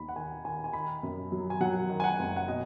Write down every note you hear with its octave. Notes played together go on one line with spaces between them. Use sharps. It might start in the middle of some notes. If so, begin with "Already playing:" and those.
Already playing: D#2 D#3 B5
F#5
D#3 G#5
D#3 G#5
G#5
D#3 B5
F#2
F#3
G#5
F#3 F#5
D#3
G#5
F#5
F#1
F#5
B2 D#5